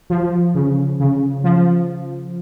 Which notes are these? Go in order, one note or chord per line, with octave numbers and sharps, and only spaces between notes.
F3
C#3
C#3
F3